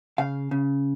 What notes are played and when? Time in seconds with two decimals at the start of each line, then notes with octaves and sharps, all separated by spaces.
0.18 C#3 F5
0.51 C#3